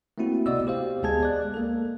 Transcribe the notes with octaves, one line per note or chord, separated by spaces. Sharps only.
A3 A#3 C4 E4 F#4
C3 B3 F#4 D5 D#5 E6
G4 C5 F5
D2 G#3 B3 G#4 A5 G#6
G#3 D5 F#6
A#3 A4